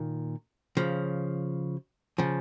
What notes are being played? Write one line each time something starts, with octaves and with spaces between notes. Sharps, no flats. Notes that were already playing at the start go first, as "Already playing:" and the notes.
Already playing: A#2 D#3
C#3 F3
C#3 F3